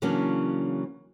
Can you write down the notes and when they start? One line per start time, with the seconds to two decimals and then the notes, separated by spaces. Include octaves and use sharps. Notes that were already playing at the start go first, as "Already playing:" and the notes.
0.02 C#3 E3 F#3 A#3 C#4 D4